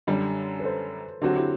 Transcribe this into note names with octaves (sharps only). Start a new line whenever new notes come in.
F#2 D3 G3
B4
A4 C5
D3 F#3 C4 F#4 G4
A4
E4 G4